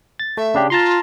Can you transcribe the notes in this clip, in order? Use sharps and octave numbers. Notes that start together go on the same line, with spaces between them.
A6
A3 E5
C#3 D4 G4
F4 A5 A#5 C6